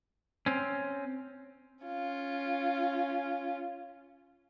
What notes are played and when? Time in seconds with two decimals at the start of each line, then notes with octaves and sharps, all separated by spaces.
0.46 C4 C#4
1.84 C#4 F4